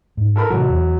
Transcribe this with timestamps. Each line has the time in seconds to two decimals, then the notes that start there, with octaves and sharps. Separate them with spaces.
0.17 G#2
0.36 A4 A#4 B5
0.50 A1 C3 F#3 G#3
0.69 E2